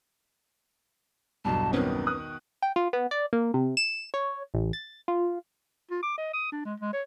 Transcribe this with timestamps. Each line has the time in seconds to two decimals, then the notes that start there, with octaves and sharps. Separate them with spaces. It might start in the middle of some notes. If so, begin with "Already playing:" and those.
1.45 B1 E2 G2 A5
1.73 B2 D#3 C4 C#4 B4
2.07 D#6 F#6
2.62 G5
2.76 F4
2.93 B3
3.11 D5
3.33 A#3
3.54 C3
3.77 E7
4.14 C#5
4.54 A1
4.73 A6
5.08 F4
5.90 F4
6.03 D6
6.18 D#5
6.33 D#6
6.52 D4
6.65 G#3
6.80 G#3
6.93 C#5